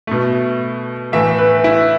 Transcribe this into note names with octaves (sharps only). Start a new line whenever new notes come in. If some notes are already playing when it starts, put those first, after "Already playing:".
B2 A3
A2 E3 A3 E5
B4
E4